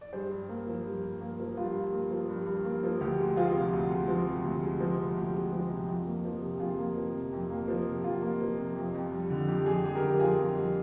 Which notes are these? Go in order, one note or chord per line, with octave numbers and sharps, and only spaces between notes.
D5
G2 G#4 C5
G2
A#3
F3
G2
G2
A#3
F3
G2 F4
G2
A#3
F3
G2
G2
A#3
F3
D2 G4
G#3
F3 F4 G#4
C3
D2
G#3
F3
C3
D2
G#3
F3
C3
D2 G4
G#3
F3
C3
F2
A#3
F3
C3
F2 F4 G#4
A#3
F3
C3
F2
A#3
F3
C3
F2 F4
A#3
F3
C3
F2
F2
G3
D3
F2 G4
F2 G#4
G4
G3 G#4
G4 A#4
D3
F2 F4 G#4
F2
G3